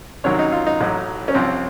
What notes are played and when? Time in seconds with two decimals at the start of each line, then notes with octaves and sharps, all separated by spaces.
0.24 C2 C3 D#3 F#3 C#5
0.39 D#4
0.52 F4
0.67 D#4
0.80 A1 A2 F#3
1.28 C#4
1.34 C2 C3 F3 C4